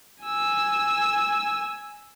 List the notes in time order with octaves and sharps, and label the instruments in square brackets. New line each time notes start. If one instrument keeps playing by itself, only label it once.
[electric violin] G#5 E6